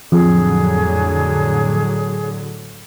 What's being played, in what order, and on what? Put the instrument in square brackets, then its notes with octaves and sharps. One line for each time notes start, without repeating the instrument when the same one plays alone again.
[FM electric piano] F2 [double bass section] A2 D3 F#3 [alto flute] G#4